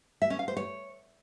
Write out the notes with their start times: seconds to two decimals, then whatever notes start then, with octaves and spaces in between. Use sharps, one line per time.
0.22 E5
0.30 C#4
0.39 F5
0.48 C5
0.57 C#5